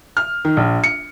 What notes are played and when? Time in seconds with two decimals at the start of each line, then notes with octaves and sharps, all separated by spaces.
0.17 F6
0.45 D#3
0.57 A#1
0.84 C#7